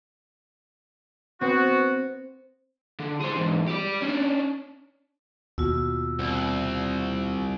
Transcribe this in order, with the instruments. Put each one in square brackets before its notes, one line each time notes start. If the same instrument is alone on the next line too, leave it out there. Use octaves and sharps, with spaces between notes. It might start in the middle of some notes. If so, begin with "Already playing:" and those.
[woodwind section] B3 F#4 [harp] C4
[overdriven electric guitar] D3
G#4 C5
E2 G#2
G4 D5
C#4 D4
[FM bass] D#2 [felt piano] B2 [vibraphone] F4 E6
[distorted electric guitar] C2